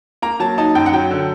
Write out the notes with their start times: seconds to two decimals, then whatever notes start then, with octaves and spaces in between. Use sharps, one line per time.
0.22 A#3 A#5
0.40 F#3 A5
0.58 D#4 A5
0.75 F#2 G5
0.86 F#5
0.93 F#3 G5
1.11 D3